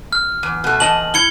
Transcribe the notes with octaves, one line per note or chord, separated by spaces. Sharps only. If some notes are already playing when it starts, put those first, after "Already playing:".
F6
E2
B2 A3
E2 D#5 A5 F#7
E4 G#6 C#7 G7